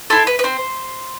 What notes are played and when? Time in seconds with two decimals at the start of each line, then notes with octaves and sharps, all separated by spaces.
0.10 E4 A4 C5
0.27 B4
0.39 B4
0.44 C4 C5